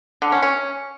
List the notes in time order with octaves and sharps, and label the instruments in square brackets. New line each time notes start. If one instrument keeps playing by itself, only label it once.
[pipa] D3
C#4
C#4